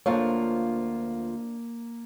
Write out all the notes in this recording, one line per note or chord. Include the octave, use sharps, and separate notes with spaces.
D2 F3 A#3 D4 F4 A4 C#5